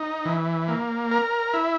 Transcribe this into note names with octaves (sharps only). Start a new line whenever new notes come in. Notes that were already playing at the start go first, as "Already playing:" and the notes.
Already playing: D#4
E3
A#3
A#4
E4